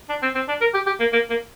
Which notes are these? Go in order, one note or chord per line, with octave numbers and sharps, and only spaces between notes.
D4
C4
C4
D4
A#4
G4
G4
A#3
A#3
A#3